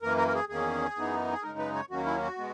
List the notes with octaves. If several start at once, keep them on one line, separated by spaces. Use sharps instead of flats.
F#2 E3 A#3 A#4
A#4
A#4
G#4
E2 D#3 A#3 C#4 G#4
F#2 E3 B3 D#4
G#4
F#2 C#3 G#3 D#4 A#4
B4
C#5
D#2 D#3 F#3 A#3 C#4 F#4
E4
F#4
B2 G#3 B3